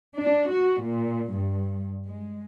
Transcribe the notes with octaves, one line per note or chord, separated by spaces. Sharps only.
D4
F#4
A#2
G2
G#3